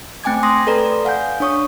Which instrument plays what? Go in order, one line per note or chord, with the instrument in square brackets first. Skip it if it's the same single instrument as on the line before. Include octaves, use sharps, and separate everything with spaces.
[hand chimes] A3 C4 G5 G#5 D6 G#6
C6 D#6 A#6
A4 B4 D5 A#5
F5 F#5 G#5 G6
D4 C#5 C#6 D#6